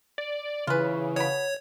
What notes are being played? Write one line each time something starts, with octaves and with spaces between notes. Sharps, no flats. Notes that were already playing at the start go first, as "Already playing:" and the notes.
D5
C#3 E3 F4 B4
B2 C#5 B5